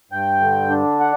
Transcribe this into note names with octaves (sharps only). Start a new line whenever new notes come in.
G2 G5
D3
D4
F#5